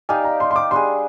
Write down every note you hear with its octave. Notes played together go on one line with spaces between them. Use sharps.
D#4 G4 D5 F5 G#5
A#5
C6
C6
D6
G3 D4 G#4 C6